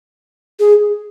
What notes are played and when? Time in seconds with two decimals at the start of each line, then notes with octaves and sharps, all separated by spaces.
0.60 G#4